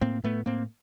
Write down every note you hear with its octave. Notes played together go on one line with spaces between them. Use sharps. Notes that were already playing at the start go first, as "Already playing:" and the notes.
A2 A#3 C4
A2 A3 B3
A2 A#3 C4